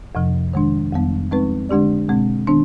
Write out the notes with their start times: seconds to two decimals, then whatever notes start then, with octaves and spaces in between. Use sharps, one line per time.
0.15 F2 C3 F3
0.53 D#3 G#3 D4
0.92 F2 D#3 G3 B3
1.31 F3 G#3 C4 D#4 B4
1.69 D3 G#3 D4 G4 D5
2.09 B2 G#3 C4
2.47 D#3 B3 D4